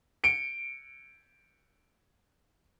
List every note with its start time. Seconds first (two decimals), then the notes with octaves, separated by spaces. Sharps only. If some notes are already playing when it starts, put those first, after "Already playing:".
0.24 C#7 D7